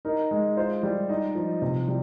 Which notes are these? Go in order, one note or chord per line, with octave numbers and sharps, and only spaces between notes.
D#4 A#4
G#3
F4 C5
G3
D#4 D#5
F3
C3
G3